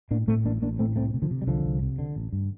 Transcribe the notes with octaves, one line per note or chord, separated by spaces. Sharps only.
A2 A#3 D4
A2 A3 C4
A1 A#3 D4
A1 A#3 D4
A2 A3 C4
C2 A3 C4
C3
D3 F3
C3
G3
C2 D3 F3
C2
C3
D3
A1
G2